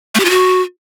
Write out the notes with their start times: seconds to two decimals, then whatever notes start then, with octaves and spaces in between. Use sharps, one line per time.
0.15 A3
0.20 G4
0.25 F4
0.30 F#4